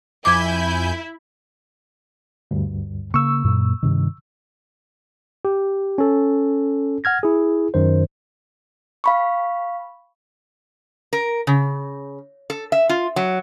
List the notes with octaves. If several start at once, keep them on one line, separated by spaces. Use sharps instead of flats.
F2 E4 G#5 D6 G6 G#6
D2 G2
C#3 A#3 C#6 E6
F#2 A#2 A#3
G2 C3 D#3
G4
C#4 A4
F#5 F6 G#6 A#6
E4 G#4
F#2 D#3 C5
F5 B5 C#6
A#4
C#3
A4
E5
F4
F#3